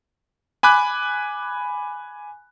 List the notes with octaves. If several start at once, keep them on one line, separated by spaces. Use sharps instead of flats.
G#5 B5 D6 F#6